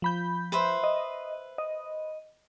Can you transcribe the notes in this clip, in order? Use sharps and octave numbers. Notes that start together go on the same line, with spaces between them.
F3 B5 G6
B4 C5 E5
D#5
D#5